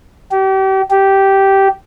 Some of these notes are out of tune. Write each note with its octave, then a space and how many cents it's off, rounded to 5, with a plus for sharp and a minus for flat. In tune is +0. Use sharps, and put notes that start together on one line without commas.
G4 -35
G4 -10